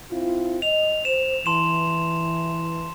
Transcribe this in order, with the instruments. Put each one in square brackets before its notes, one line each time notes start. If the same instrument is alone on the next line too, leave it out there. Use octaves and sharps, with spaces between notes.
[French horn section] C4 E4 F4
[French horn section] D#5 [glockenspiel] F7
[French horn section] C5 [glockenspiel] E7
[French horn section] E3 [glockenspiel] A5 C6 E7